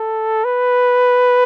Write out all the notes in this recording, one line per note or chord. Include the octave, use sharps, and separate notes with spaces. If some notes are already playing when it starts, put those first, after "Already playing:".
Already playing: A4
B4